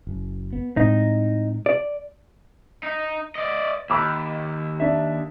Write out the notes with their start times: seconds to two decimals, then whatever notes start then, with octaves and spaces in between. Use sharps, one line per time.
0.07 F#1
0.53 B3
0.77 A2 G#3 C4 D#4
1.66 D5
2.83 D#4
3.35 D5 D#5
3.90 D#2 B5 D6 E6
4.80 D4 E5